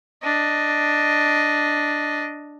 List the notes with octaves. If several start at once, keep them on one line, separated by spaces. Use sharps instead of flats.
D4 D#5